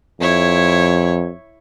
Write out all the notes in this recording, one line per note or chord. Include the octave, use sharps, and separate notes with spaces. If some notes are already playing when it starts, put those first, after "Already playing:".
F2 E4 C#5